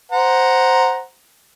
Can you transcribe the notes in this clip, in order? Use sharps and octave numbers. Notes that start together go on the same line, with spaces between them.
C5 F#5 A#5